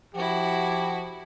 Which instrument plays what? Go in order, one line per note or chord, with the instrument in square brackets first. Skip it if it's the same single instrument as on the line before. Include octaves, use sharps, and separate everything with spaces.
[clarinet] F3 [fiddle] E4 F#4 [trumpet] G4